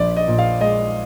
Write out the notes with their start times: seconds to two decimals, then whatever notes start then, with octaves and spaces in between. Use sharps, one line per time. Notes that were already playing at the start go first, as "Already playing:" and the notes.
Already playing: A#1 D5
0.16 D#5
0.28 A#2
0.39 F5
0.61 G#3 D#5